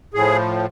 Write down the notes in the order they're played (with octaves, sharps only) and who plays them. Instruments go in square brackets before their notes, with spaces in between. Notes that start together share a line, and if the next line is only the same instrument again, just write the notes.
[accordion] A2 F3 G#4